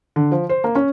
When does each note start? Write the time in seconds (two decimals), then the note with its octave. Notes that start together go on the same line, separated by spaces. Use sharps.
0.16 D3
0.32 F3
0.49 C5
0.64 A#3
0.75 C#4